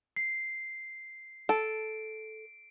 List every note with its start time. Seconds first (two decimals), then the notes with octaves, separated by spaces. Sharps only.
0.16 C7
1.49 A4 D7